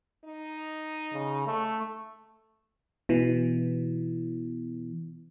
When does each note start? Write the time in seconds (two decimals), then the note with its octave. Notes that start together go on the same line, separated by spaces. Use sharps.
0.25 D#4
1.13 C#3
1.47 A3
3.09 B2 E3